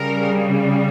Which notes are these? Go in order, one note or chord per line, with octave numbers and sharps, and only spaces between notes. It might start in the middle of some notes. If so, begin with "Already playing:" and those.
Already playing: C#3 G3 A#4